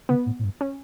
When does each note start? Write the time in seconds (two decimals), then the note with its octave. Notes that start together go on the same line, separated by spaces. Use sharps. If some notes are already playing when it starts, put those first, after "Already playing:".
0.09 C#3 B3
0.26 A2
0.39 A2
0.44 G2
0.61 C#4